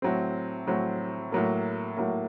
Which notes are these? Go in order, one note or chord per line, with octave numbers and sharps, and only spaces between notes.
A2 F#3 C4
A2 F#3 C4
A2 F#3 A#3
A2 F#3 A#3